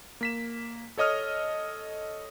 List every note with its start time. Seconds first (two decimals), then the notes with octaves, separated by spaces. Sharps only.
0.21 A#3 B6 E7
0.97 A4 C#5 D#5 D#6 F6